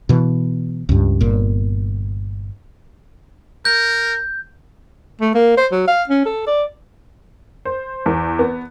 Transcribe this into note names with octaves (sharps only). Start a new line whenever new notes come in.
B2 E3
C#2 G2
G1 A#2
A#4 G6
A3
A#3
C5
F#3
F5
C#4
A4
D5
C5
E2
B3